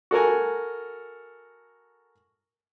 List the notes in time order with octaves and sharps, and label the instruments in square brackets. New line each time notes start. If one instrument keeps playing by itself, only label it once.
[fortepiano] F#4 A4 A#4 G#5